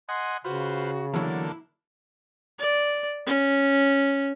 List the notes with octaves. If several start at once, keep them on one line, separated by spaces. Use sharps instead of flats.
D#5 F#5 G#5 C6
C#3 F4 F#4 B4 C5
E2 D3 F#3 A#3 E4 A4
D5
C#4